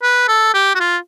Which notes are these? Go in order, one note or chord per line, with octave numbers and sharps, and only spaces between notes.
B4
A4
G4
F#4
F4